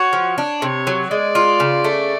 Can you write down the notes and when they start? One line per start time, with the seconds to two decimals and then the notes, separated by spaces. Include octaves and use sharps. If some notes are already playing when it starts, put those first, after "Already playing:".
Already playing: F#4 C#5
0.13 F3
0.38 D4
0.62 C3 C#5
0.87 F#3
1.11 G#3 D5
1.35 F4
1.60 C#3
1.84 A3